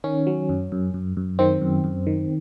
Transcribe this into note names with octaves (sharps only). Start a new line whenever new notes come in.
D#3 C#4
F#3
F#2
F#2
F#2
F#2
D#3 C4
F#2
F#2
D#3